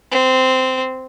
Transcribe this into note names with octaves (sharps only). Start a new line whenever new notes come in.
C4